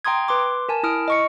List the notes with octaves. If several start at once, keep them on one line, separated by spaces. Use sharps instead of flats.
G5 A#5 C6 D#6 G#6
B4 C6 D6
A#4 G#5 A5
E4 D#6 F6 D7
D#5 C#6 C#7